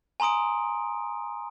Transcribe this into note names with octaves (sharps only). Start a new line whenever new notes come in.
G#5 A#5 C6 D#6 D7